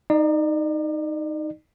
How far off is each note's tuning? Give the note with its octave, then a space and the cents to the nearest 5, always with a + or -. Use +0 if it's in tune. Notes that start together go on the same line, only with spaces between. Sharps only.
D#4 +0 D5 +40